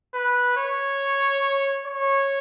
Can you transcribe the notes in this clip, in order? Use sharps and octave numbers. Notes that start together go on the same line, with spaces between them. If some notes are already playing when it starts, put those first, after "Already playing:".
B4
C#5
C#5